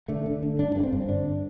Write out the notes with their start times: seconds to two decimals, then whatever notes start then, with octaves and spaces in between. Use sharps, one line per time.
0.08 D3 A3
0.26 D3
0.43 D3
0.58 G2 D4
0.75 G2
0.83 C4
0.92 G2
1.08 D3 D4